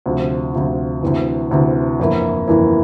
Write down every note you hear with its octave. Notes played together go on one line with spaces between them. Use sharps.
D2 C3 F3
D2 C3 F3
D2 C3 E3
D2 C3 E3
G1 F2 E3 A#3 E4
G1 F2 E3 A#3 E4